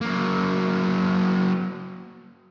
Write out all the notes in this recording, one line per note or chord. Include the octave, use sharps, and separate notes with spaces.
F#3 A#3